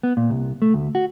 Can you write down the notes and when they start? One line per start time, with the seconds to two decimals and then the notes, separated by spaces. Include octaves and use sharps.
0.03 B3
0.17 A#2
0.30 C2
0.62 A3
0.74 D2
0.95 F#4